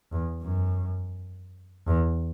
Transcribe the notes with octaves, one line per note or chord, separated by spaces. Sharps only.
E2
F#2
E2